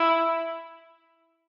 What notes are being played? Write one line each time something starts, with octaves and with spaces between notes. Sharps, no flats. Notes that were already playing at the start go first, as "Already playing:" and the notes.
Already playing: E4